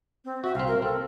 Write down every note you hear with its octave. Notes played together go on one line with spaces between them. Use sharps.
C4
F#4 E5
C2 C4 F5
A#4
C4 A4